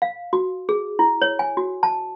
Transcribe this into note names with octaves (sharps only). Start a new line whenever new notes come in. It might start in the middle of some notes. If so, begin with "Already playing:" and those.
F5
F#4
G#4
E4
C#5
G#5
F#4
A5